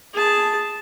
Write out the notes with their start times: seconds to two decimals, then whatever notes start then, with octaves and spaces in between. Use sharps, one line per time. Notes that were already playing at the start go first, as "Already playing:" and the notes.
0.14 G#4 A5